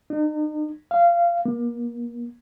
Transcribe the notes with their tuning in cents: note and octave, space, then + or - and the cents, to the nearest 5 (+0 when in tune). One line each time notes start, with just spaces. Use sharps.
D#4 -40
F5 -20
A#3 +30